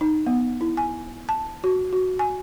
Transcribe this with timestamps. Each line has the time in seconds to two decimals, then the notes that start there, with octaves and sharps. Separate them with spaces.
0.01 D#4
0.26 B3
0.61 E4
0.77 G#5
1.29 A5
1.64 F#4
1.93 F#4
2.19 G#5